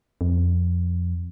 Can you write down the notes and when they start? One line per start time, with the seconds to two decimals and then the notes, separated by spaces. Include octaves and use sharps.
0.21 F2